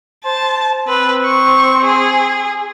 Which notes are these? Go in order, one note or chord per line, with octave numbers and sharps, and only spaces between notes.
C5 A5
C4 B4
C#6
G#4